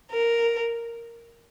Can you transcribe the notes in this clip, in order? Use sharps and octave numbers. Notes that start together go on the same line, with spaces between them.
A#4